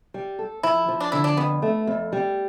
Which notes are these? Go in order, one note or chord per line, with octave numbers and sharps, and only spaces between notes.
G3
A4
F3 E4
F3
D4
D3 E4
D4
F2 B3
A3
F2
G3